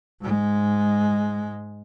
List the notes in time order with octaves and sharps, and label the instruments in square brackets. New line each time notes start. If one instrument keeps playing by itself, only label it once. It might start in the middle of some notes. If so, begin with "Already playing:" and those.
[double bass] G#2 G#3